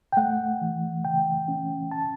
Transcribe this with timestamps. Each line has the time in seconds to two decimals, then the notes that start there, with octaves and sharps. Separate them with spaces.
0.12 G5
0.17 A3 F#5
0.62 E3
1.04 C#3 G5
1.48 C#4
1.91 A5